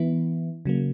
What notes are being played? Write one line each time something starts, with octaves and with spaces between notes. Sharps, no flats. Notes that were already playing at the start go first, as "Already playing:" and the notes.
Already playing: E3 B3 E4
C#3 F#3 A#3